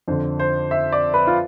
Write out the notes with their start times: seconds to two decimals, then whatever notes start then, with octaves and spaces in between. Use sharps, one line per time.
0.08 F2 D3 C5
0.40 C5
0.71 E5
0.92 D5
1.14 B4
1.27 F4